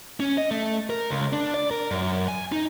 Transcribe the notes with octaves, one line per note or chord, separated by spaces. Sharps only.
C#4
D#5
A3
A#4
C#2
D4
D5
A#4
F#2
G#5
D#4